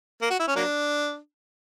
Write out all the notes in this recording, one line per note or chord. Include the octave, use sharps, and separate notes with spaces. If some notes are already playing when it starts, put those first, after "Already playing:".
A#3
F#4
E4
C#4
F#3 A#3 D4